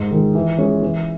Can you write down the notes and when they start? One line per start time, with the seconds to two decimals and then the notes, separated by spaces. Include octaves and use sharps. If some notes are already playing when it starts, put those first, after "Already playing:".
Already playing: G#2
0.11 D#3 G#3
0.35 E3
0.58 G#3 C#4
0.82 E3